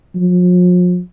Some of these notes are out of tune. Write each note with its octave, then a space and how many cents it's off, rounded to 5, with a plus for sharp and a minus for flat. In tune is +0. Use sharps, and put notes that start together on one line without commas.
F3 +45